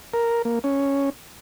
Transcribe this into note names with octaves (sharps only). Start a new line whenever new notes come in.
A#4
A#3
C#4